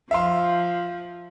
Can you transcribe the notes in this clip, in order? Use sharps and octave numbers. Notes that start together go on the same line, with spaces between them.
F3 E5 F5 C6